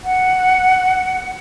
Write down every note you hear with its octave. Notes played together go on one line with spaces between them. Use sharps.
F#5